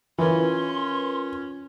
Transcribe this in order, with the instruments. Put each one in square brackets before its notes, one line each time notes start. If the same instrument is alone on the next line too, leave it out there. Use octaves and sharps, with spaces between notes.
[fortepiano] E3 [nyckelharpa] C#4 [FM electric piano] F4 A#4 B4 [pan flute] C6